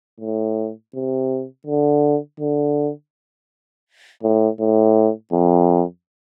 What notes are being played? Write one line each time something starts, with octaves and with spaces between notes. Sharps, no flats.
A2
C3
D3
D3
A2
A2
F2